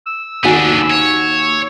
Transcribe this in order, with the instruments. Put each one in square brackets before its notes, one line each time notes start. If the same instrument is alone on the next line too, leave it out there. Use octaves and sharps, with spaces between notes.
[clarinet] E6
[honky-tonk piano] D#2 F#4 G#5 [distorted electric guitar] B3 D4
[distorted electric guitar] C#5